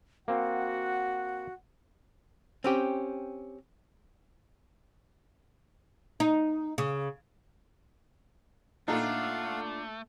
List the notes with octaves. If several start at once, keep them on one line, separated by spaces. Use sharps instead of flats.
A#3 C4 F#4 F#5
C4 C#4 G4
D#4
C#3
A#2 A3 D4 D#4 F4 A4 F5 F#5